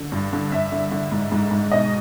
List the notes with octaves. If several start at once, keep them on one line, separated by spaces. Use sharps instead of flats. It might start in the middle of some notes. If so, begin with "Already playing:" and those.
Already playing: D3
G2
D3
G2 E5
D3
D3
G#2
G#2
G#2
B2 D#5